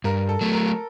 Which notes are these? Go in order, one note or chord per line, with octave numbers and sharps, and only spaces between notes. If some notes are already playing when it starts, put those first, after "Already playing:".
G2 A#4
A4
F#3 A3
A#4